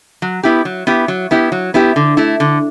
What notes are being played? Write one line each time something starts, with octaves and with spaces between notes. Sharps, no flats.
F#3
B3 E4 G4
F#3
B3 E4 G4
F#3
B3 E4 G4
F#3
B3 E4 G4
D3
A3 E4
D3